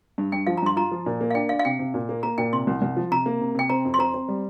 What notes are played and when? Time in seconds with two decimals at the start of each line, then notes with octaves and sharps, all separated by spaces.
0.18 G2
0.32 G2 G5
0.47 F3 F5
0.57 A#5
0.62 G2 C6
0.76 F4 A#5
0.91 F3
1.06 A#2
1.21 A#3
1.31 F5
1.35 D4 G5
1.49 D4 F5
1.59 F5
1.65 C3 G5
1.79 C3
1.94 A#2
2.09 A#3
2.23 A#3 A#5
2.38 A#2 G5
2.53 C3 C6
2.67 C2
2.82 C2
2.96 F3
3.11 C3 A#5
3.26 A#3
3.41 C3
3.55 C3 G5
3.69 C4 A#5
3.85 F2
3.94 C6
3.99 C4 A#5
4.14 C4
4.28 G3